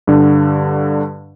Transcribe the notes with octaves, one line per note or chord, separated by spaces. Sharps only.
G2 D3